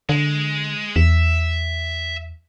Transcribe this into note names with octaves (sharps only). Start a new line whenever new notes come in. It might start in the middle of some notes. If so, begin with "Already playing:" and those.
D3 G#3
E2 E5